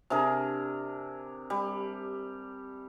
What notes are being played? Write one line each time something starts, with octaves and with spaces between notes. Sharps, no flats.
C3 D4 G#4 A#4
G3